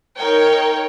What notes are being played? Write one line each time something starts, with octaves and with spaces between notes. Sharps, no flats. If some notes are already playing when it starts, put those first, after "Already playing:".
D#4 A#4 C#5 G5